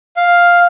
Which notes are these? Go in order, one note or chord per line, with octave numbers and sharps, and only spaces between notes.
F5